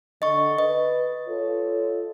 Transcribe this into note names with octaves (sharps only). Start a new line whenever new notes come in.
D3 D#5 C#6
B4 D#5
F4 A4 C#5